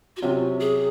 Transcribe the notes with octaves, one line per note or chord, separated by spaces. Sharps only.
F#4
C3 F#3 C#4 F4
G#4